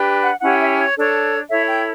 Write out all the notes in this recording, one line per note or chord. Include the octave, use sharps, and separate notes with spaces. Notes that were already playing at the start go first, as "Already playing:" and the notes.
Already playing: D4 G4 B4
F#5
C#4 E4 G4 C#5 F#5
E5
C#5
D4 A4 C#5
E4 A4 C#5 E5
G5